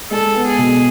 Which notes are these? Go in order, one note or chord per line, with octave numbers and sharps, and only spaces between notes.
G#3 A4
B3
G#4
B2